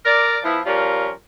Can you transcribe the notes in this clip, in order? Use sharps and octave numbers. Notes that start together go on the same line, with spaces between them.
A#4 D5
F3 B3 E4
F3 G3 C#4 F4 A#4